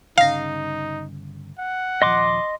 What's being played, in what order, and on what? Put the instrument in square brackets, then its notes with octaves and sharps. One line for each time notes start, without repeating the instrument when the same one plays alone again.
[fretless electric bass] G1 C#3 [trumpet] D#4 [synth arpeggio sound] F5 A#6
[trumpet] F#5
[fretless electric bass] D#1 F3 [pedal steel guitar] D#5 C6 D6